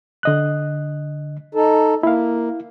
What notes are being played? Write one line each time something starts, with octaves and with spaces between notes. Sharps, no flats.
D3 D#5 F#6
D#4 A4
A#3 E4 F5